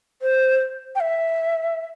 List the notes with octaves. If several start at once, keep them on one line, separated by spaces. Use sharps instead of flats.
C5
G5
E5